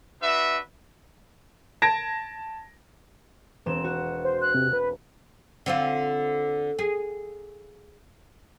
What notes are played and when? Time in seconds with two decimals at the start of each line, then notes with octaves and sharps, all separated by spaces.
0.21 D4 F#4 B4 E5
1.82 A5 G#6 A#6 D7
3.66 E1 C4 E7
3.84 F#4
4.24 C5
4.42 F#6
4.54 C3
4.73 B4
5.66 D3 C4 F4
6.79 G#4